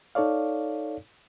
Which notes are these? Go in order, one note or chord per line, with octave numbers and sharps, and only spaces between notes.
D#4 A4 C#5 D5 F5